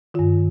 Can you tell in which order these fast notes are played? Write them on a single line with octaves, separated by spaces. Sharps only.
D#3 F4 G2